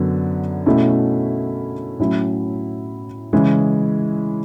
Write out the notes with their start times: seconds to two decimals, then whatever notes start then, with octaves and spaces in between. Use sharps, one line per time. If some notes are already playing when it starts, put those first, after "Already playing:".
Already playing: F#2 D3 F#3 B3
0.66 B2 A3 C#4 E4
1.99 A2 F#3 C#4 E4
3.33 C#3 E3 G#3 C#4 E4